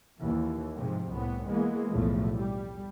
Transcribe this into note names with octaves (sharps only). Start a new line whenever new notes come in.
D#2 E3
G#2 C3 F3
C2 A2 B3
E3 G#3 A#3 B3
B1 E2 A2 F3 A3
G3